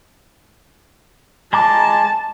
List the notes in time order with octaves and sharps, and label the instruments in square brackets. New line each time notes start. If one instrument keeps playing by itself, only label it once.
[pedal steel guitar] G#3 A#5 D6 [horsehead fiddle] A5